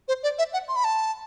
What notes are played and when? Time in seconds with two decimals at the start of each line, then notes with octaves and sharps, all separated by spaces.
0.08 C5
0.23 D5
0.39 E5
0.53 F#5
0.68 C6
0.76 B5
0.84 A5